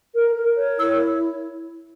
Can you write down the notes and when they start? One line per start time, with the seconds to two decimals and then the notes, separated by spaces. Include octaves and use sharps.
0.14 A#4
0.36 A#4
0.56 C#5
0.78 E4 E6